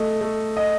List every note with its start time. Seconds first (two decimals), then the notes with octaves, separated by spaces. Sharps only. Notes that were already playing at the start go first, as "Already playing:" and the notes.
Already playing: A3 D#5
0.21 A3
0.57 D#5